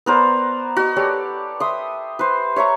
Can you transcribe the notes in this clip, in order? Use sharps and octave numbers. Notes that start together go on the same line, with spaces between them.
B3 A#4 C5 D5
F#4 D#5
G4 A4 C#5 D5
E5 C6 D#6
B4 C5
C#5 E5 A#5 C#6